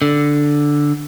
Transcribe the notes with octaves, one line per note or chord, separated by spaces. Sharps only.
D3